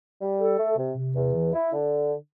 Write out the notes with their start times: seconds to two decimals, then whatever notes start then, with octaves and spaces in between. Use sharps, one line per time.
0.21 G3
0.39 A4
0.58 A3
0.77 C3
0.96 C3
1.15 E2
1.34 E3
1.53 E4
1.73 D3